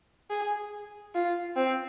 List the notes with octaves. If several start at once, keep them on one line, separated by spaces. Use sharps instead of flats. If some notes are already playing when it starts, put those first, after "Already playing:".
G#4
F4
C4